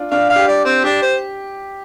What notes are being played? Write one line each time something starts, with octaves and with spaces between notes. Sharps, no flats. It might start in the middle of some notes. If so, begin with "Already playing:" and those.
Already playing: D4 F4
D4 F5
F5
G4
D5
C4
D4 G4
C5